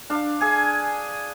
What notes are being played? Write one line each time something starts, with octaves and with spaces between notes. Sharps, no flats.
D4 F5
G#4 G#5